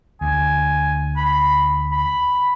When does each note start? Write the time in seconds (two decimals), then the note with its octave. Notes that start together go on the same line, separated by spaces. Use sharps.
0.21 D2 G#5
1.16 B5
1.92 B5